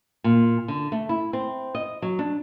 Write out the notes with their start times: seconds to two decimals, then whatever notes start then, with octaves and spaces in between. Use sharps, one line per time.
0.24 A#2
0.68 D3
0.92 A3
1.09 E4
1.33 C4
1.75 D#5
2.02 F#3
2.19 D4